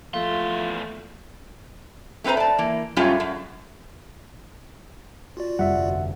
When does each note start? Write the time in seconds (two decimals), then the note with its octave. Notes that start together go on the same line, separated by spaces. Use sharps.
0.14 E2 F3 A3 F5 C6
2.24 A3 C4 B4 C5 A#5
2.37 D5 A5
2.58 E3 A#3
2.96 F#2 G3 A3 C#4 F4 G#4
3.20 F#2
5.37 F4 F#4 D5
5.59 F1 G3 E5 F#5
5.73 G1